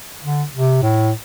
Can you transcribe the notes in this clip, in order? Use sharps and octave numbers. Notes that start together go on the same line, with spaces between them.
D3
C3
A2